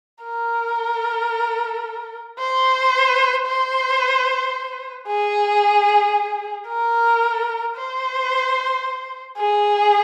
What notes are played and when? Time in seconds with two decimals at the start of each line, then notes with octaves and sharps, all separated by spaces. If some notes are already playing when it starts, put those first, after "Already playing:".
0.24 A#4
2.39 C5
3.46 C5
5.08 G#4
6.69 A#4
7.76 C5
9.38 G#4